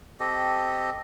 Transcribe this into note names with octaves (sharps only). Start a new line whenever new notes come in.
C4 G4 A4 D#5